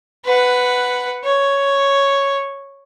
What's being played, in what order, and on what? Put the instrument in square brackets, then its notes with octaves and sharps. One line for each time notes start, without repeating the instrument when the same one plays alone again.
[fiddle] B4 F#5
C#5